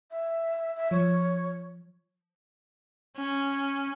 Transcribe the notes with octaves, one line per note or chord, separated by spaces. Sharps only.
E5
E5
F3 C#5
C#4